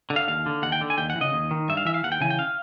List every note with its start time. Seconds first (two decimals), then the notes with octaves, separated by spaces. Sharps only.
0.10 D3
0.16 F5
0.28 D#2 F5
0.46 D3
0.63 D#2 F#5
0.72 G5
0.81 D3
0.90 G#5
0.98 D#2 G5
1.10 F#5
1.16 E3
1.21 C#3 D#5
1.33 D#2
1.51 D#3
1.69 G2 E5
1.77 F5
1.85 E3 E5
1.94 F5
2.04 D#2 F#5
2.12 G5
2.21 C#3 E3 G#5
2.30 G5
2.39 F5